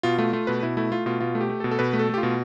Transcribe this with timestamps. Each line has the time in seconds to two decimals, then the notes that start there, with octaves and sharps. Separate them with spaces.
0.03 B2 F4
0.18 A3 F4
0.33 A3 F4
0.47 B2 B4
0.63 B2 E4
0.77 A3 E4
0.92 A3 F4
1.06 B2 F4
1.20 B2 F4
1.35 A3
1.41 G4
1.50 A3
1.60 A4
1.64 B2
1.71 A4
1.79 B2 B4
1.93 A3
1.99 A4
2.09 A3 G4
2.18 F4
2.23 B2